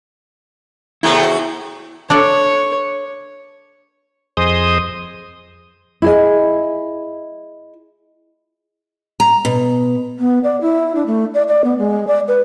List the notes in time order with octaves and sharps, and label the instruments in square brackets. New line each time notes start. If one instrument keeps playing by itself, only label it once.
[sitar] C3 F#3 A3 [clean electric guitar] E4 G#4
[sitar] F#4
[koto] D4 A4 D5 [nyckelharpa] C#5
[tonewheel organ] F2 G#4 C5 D#5 D#6
[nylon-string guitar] E4 G#4 D#5
[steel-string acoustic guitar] A#5
B2
[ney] B3
D5
E4
D4
A3
D5
D5
B3
G#3
D5
B4